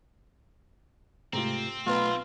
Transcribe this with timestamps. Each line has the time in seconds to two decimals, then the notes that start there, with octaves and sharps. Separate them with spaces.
1.33 G#2 C3 A3 C4 F4 G4 A#5
1.86 B1 A3 B3 F4 B4 A#5